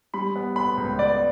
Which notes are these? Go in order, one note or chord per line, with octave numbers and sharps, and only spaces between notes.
G3 B5
B3
B3 B5
C#2
B3 D5